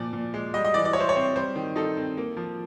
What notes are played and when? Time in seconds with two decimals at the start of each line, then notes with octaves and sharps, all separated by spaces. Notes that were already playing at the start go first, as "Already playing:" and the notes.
Already playing: A#2 F3 D5
0.13 A#2
0.34 G#3
0.54 G3 D#5
0.64 D#5
0.74 E3 D5
0.85 D5
0.93 E4 C#5
1.00 C5
1.09 C#5
1.15 C4
1.36 G3 C5
1.55 D#3
1.76 D#4 A4
1.97 C4
2.17 A#3
2.37 F3